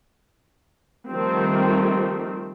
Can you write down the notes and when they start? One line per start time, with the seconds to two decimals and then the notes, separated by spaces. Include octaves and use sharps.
1.08 D#3 F3 G3 A3 C4